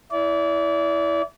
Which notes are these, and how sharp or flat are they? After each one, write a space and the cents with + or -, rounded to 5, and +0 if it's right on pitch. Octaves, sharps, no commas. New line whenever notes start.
E4 +0 D5 -35